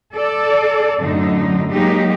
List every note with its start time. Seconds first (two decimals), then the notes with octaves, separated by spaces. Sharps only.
0.13 A4 D5
1.00 F#2 A2 D3 D#4
1.71 F#3 G#3 A#3 D#4 G4